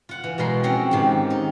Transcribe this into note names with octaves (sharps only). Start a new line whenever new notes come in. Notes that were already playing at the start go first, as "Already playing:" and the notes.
F4 F#5
E3
B2 G#3 A#4 B5 C6
F3 C4 C#4 F#4
G#2 D#3 G4
D#4